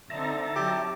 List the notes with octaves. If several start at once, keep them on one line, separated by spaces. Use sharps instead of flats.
D3 C4 D#4 E5 A5 A#5
F#3 G4